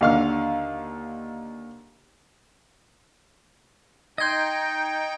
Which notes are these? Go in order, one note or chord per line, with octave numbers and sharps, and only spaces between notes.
D#2 D3 F5 C#6 F6
D#4 D#5 G5 C6 G6 G#6 A#6